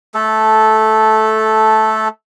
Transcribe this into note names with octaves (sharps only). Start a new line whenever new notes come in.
A3 A4